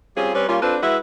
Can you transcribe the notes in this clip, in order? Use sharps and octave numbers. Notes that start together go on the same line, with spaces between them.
G3 C4 C#4 F4 G#4
G3 C4 C#4 B4 C#5
G3 A#3 C#4 F4
C4 D4 F4 A4 B4
G#3 E4 F#4 B4 E5